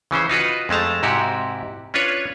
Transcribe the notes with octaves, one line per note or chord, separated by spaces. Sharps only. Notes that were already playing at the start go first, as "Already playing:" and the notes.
C#3 E3 C#4 C5
D#4 F4 F#4 B4
F2 G#3 A3 A5 A#5
G#2 C3 E4 F#4 G4
C#4 D4 F4 B4 C#5